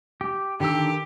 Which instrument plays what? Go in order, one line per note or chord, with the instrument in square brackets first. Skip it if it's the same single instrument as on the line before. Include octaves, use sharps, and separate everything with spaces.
[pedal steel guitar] G4
[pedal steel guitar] D3 D#3 E6 [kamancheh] G4